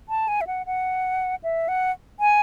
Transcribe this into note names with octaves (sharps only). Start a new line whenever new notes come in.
A5
G#5
E5
F#5
F#5
E5
F#5
G#5